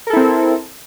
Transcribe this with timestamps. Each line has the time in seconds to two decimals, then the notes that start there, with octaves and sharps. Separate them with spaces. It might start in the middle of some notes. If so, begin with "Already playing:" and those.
0.07 A#4
0.10 A4
0.13 E4
0.17 C4